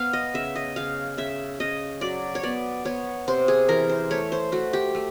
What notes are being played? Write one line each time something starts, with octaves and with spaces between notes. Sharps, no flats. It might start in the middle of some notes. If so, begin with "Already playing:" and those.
Already playing: B3 F5
D#5
C#3 E5
D#5
C#3 F5
C#3 E5
C#3 D#5
F#3 D5
C#5
B3 D5
B3 C#5
C3 C5
G#4
E3 A#4
C5
A3 C#5
C5
A3 F#4
G4
A3